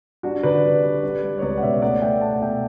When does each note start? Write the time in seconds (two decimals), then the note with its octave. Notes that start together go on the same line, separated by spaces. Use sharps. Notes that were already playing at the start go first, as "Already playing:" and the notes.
0.23 G3 D4 F#4
0.43 D3 B4 D5
0.63 G3
0.83 G3
1.03 G3
1.23 G3
1.38 C#5
1.42 C#2 B4 D5
1.58 F#5
1.62 B2 C#5 E5
1.82 A3 D5 F#5
2.02 A3 E5 G5
2.21 B2 F#5 A5
2.34 F#5
2.42 B2 E5 G5